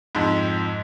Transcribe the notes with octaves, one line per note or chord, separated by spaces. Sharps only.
F2 G#2